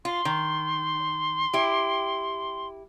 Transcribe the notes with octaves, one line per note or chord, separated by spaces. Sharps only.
F4 C6
D#3
E4 G4